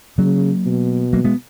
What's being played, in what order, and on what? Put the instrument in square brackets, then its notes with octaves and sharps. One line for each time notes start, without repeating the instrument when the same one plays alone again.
[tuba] C#3 [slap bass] F#3 A#3
[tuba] B2
[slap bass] F#3 A#3
G#3 B3